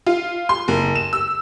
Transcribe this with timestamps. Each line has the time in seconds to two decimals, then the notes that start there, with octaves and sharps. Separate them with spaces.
0.07 F4
0.49 C6
0.68 F#1
0.95 E7
1.13 E6